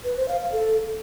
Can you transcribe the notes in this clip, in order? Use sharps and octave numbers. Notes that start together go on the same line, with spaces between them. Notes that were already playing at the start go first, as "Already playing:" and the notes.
B4
C5
F5
F5
A4